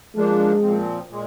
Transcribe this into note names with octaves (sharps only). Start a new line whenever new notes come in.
F3 G#3 A#3 D4
A#2 F3 C4
A#2 G#3